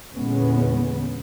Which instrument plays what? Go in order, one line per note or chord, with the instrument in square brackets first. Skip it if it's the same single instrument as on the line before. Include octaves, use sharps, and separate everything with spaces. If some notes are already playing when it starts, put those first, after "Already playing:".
[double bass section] E2 A#2 D3 G#3 B3 C#4